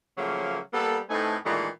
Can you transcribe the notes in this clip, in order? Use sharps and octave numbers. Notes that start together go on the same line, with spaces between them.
C#3 F3 F#3 A3 A#3
G3 A#3 B3 A4
A2 A3 C4 D#4 B4 G#5
A#2 D#3 E3 G#3 A3